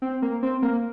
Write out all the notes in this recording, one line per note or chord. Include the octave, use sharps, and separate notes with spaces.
C4
A#3
C4
A#3